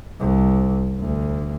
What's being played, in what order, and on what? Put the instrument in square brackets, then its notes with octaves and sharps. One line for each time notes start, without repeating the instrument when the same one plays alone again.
[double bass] C2
D2